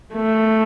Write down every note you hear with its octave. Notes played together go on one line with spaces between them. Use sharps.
A3